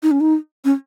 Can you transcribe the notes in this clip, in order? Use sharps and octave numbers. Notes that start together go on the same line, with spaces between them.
D#4
C#4
D#4
C#4